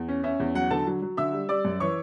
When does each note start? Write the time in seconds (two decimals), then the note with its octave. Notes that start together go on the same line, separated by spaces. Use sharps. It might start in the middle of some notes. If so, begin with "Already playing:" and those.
Already playing: E2
0.08 C#4
0.24 C#4 E5
0.40 E2
0.55 F#3 F#5
0.70 D3 A4 A5
0.87 F#3
1.02 F#3
1.17 D3 E5 E6
1.33 G3
1.49 G3 D5 D6
1.65 F#2
1.80 E3 C#5 C#6